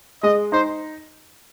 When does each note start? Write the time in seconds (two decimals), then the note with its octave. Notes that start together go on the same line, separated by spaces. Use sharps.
0.23 G#3 D#5
0.52 D#4 C5